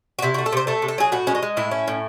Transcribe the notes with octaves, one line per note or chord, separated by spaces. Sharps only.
F#4
C3 E4
A3 F#4
A4
C3 C5
A3 A4
C3
A4
F#3 G#4
A2 F#4
G#3 C#4
D#4
G#3
A2 E4
C#4
A2